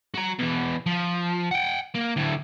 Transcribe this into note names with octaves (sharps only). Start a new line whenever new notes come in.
F#4 A#5
B2 E3
F3
F#5 G5
A#3
D2 A2